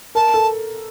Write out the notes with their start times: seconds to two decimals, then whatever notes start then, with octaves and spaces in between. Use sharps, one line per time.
0.15 A#4 A5
0.34 A4